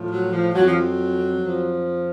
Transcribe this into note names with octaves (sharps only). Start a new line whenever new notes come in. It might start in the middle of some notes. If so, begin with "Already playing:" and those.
Already playing: A2 F3
F#3
F3
F2 F3 F#3
F3
F#3
F2 F3